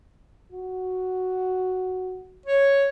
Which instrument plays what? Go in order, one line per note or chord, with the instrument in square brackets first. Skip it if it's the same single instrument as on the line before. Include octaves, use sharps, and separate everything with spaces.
[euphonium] F#4
[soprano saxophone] C#5